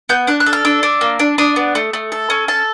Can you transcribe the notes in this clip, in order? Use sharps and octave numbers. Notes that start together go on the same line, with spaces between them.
B3 G6
D4 F#6
F#6
A4
F6
D4 E6
D4
A#3
D4
D4 D#6
B3
A3
A3
A4
C#4
A4 A5